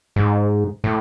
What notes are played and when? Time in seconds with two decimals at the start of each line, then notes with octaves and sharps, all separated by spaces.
0.16 G#2
0.84 A2